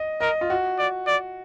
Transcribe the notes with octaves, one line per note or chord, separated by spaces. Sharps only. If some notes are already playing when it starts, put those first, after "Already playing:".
Already playing: D#5
A#4 D#5
F4
F#4
D5
D5